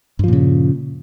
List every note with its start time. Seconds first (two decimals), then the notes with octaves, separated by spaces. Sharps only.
0.19 G2
0.24 F3
0.28 A#2
0.33 C#3